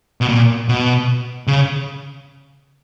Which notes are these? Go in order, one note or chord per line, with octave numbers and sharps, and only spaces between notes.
B2
A#2
B2
C#3